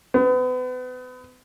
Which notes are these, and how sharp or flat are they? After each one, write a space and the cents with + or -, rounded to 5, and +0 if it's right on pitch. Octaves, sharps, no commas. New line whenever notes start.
B3 +35